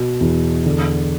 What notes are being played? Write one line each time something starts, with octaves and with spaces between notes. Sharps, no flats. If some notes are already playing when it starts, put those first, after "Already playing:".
Already playing: B2
E2
D3